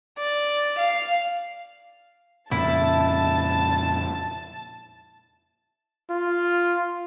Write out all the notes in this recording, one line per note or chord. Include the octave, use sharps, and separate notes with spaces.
D5
F5
F2 A#2 C#3 E4 A5
F4